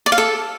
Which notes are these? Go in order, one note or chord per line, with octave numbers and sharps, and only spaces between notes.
D5
F5
A4